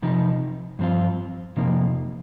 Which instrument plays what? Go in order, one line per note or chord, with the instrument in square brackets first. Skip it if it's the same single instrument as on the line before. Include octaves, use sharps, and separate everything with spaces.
[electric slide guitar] C3 F3 D#4
G2 F3 C4 F4
F2 C3 F3 A#3 D#4